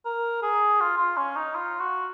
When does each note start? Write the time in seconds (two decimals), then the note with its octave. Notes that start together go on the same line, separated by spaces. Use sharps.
0.05 A#4
0.42 G#4
0.81 F4
0.98 F4
1.17 C#4
1.36 D#4
1.55 F4
1.80 F#4